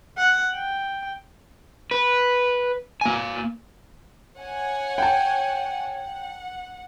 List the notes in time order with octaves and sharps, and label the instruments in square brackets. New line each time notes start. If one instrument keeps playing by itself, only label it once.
[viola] F#5
G5
[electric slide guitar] B4
A#3 G#5
[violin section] C#5 F#5 G#5
[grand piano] G5 A5
[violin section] F#5